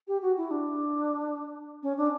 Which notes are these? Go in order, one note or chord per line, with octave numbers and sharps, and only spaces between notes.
G4
F#4
E4
D4
C#4
D4